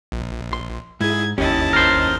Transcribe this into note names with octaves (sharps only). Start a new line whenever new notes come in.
A#1
C6
G#2 E4 G#4 G#6
G1 D#2 C#4 E4 G4 D#5 A5
A#4 C5